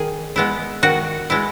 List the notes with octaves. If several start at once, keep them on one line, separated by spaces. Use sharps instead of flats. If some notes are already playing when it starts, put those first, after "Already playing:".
Already playing: D#3 G#4
G#3 B3 E4
D#3 F#4
G#3 B3 E4